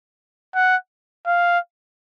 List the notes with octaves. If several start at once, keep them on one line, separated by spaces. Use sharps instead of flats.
F#5
F5